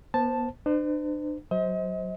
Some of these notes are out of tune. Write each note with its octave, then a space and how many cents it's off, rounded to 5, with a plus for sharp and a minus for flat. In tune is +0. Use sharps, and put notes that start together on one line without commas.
B3 -35 C5 +0 A5 +0
D4 +40 C5 -40
F#3 +0 C5 +0 D#5 +40